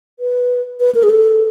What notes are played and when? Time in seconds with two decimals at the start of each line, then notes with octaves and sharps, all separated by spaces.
0.20 B4
0.80 B4
0.95 A#4
1.03 G#4
1.10 A4